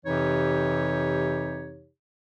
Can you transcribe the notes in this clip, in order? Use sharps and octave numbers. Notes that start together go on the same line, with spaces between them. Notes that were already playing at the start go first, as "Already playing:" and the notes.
F2 C3 E3 D#4 G4 C#5